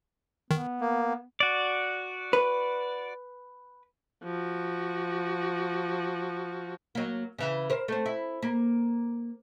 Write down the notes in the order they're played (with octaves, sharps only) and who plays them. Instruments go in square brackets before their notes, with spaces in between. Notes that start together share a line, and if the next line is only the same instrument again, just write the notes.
[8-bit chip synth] D#3 [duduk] B3
[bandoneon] A#3
[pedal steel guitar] F#4 D5
[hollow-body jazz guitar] B4
[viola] F3 F#4
[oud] F#3 A#3
C#3 E3
A#4 C5
A3 C4
E4
A#3